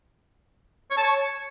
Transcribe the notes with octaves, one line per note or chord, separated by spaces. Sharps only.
C#5
A5
C#5